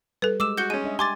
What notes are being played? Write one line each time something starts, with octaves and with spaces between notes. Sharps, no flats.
G3 A4 B4
G#3 D6 E6 E7
F#4 G6 C#7 G7
G#3 C#4 D#7
D4 D#5 E5
G4 G#5 C6 D6 A6